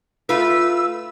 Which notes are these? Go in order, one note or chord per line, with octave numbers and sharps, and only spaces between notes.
A3 F4 B4 E6